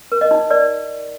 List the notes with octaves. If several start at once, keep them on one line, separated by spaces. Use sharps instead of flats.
A#4
D#5
D#4
A#4 D5